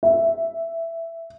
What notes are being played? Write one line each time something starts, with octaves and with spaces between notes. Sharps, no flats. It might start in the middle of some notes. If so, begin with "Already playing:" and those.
E5